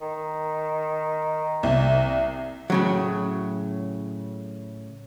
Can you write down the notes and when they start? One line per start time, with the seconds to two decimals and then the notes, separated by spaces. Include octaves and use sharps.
0.02 D#3
1.63 C2 C3
2.70 A2 C#3 F#3